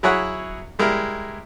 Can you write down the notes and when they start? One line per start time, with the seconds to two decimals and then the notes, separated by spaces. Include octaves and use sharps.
0.03 F#3 E4 G#4 C#5 F#5
0.79 G3 G#3 E4 A#4